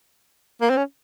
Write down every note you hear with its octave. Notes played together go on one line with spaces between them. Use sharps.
A#3
C4
C#4